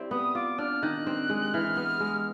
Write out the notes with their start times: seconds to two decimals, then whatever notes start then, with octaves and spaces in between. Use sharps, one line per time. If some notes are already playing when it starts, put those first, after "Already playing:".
Already playing: G3 C4 E4
0.11 B3 D#6
0.35 F4 D6
0.58 D4 F6
0.83 D#3 F#6
1.07 C4
1.30 G#3
1.54 E3 F6
1.77 B3
2.00 G#3